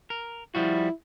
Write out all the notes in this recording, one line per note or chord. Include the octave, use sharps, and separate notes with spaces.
A#4
F3 G3 E4 F#4